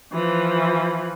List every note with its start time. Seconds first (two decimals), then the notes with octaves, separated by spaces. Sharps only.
0.13 E3 F3